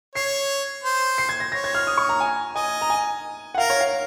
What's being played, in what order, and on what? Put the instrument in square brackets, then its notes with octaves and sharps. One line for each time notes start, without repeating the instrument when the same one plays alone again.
[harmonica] C#5 [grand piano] C7
[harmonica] C5
[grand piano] C7
G#6
A#6
[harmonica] C#5 [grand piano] A#6
[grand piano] G#6
F6
D#6
C#6
A#5
G#5
[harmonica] D#5 [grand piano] G#5
[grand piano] A#5
G#5
F#5
[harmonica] A#4 [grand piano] F5
[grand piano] C#5
F5